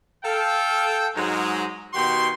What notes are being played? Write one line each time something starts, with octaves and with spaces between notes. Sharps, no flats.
A4 F5 G5
G#2 F#3 G#3
B2 D#3 F#4 G4 C6